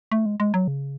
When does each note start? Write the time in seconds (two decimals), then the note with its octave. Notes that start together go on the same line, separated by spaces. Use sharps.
0.12 A3
0.26 G#3
0.40 G#3
0.54 F#3
0.68 C#3